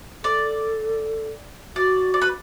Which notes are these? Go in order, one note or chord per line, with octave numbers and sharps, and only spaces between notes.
A4 D5
F#4 D5
D5
B4